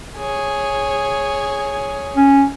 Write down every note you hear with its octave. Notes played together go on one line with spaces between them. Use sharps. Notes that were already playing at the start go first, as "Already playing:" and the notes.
G#4 C#5
C#4